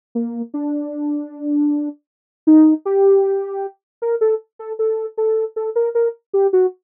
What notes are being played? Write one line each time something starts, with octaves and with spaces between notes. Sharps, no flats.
A#3
D4
D#4
G4
A#4
A4
A4
A4
A4
A4
A#4
A#4
G4
F#4